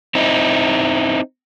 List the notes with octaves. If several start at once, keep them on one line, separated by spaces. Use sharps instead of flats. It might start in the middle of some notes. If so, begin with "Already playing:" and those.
C4 D#4 E4